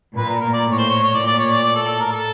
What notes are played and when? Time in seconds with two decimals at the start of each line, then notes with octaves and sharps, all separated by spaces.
0.17 A#2 B4
0.29 A#4
0.41 A#4
0.54 D5
0.66 A2
0.72 C#5
0.78 C5
0.90 C#5
1.03 C#5
1.14 A#2 D5
1.27 D5
1.39 C#5
1.52 D5
1.63 A2 D5
1.76 A4
1.87 A4
2.00 A#4
2.13 A4